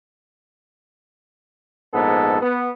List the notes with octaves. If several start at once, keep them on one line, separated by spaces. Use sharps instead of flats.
A#1 G#2 B3 A4
B3